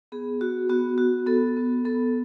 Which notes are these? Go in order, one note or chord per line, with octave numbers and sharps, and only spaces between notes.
B3 G#4
F#4
B3 F#4
F#4
B3 A4
B3
B3 A4